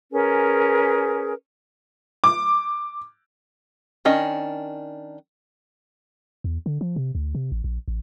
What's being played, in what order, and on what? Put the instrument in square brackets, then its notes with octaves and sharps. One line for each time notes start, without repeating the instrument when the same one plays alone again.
[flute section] C#4 G#4 A#4 B4
[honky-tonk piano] D6
[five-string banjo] D#3 C#4 D4 D#5
[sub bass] E2
D3
F3
C3
D2
C3
A1
A#1
A1